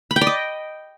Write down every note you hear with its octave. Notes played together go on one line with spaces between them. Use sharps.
B5
G5
D5
D#5